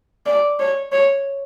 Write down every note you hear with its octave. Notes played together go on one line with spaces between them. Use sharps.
D5
C#5
C#5